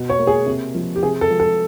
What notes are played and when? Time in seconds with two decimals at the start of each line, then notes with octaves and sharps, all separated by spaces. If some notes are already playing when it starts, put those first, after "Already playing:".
Already playing: B2
0.10 C#5
0.19 A#3
0.27 G#4
0.46 C3
0.75 F3
0.96 G4
1.02 C3 G#4
1.21 A4
1.30 F3
1.40 A4